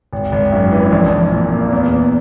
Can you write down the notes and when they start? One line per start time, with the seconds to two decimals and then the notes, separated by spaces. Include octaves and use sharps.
0.13 G#1
0.32 G#1
0.52 F#2
0.72 E3
0.92 A#1
1.12 A#1
1.32 A#2
1.53 A#3
1.72 E2
1.93 E2